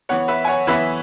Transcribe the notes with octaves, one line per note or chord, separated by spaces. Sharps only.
E3 B3 C#5 F#5
B4 E5
G#5
C#5 F#5
E3 B3 B4 E5